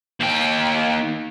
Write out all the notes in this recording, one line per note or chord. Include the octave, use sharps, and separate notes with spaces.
D#2 G5